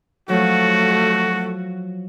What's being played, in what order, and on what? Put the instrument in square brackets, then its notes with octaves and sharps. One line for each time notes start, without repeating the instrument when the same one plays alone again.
[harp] F3 F#3 [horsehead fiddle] A3 [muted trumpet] F#4